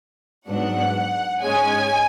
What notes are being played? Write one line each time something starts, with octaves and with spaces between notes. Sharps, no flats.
G#2 F#3 B3 D4 F#5
G#2 G#3 C#4 G#5